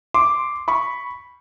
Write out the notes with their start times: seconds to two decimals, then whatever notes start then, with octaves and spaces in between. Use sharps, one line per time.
0.14 C6 D6
0.68 B5 C#6